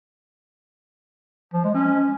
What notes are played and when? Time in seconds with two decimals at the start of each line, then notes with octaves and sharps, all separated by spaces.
1.54 F3
1.64 G#3
1.74 C#4